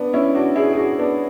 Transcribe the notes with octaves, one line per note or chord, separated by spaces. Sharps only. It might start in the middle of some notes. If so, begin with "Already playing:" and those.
Already playing: B3 D4
C#4 E4
D4 F#4
E4 G#4
G#4
D4 F#4
B3 D4